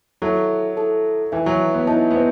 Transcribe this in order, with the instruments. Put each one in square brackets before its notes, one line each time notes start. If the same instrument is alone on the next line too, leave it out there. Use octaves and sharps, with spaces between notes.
[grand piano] F#3 [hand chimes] E4 A4 E5 A5
[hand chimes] E4 A4 E5 A5
[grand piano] E3 [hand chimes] E4 B4 E5 A5
[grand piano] F#3
B3
[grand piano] D#4 [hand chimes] E4 B4 E5 A5
[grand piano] B3
C4